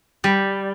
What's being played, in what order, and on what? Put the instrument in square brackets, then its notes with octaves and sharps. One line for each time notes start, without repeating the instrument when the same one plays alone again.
[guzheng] G3